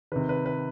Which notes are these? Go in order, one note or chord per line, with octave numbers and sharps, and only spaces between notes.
C3 D#3 B4
B4
B4